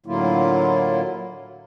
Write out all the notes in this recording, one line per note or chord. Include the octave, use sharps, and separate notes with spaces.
A2 D3 F#3 A#3 E4 F4